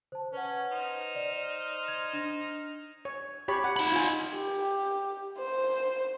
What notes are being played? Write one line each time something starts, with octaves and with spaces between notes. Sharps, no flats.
C5 A5
C#4 B4 F#5
D#4 C5 F6
D5
G#6
D4 A#6
C#5
G4 C#5 B5
F#5
D#4 B5
F4 G#5
G4
C5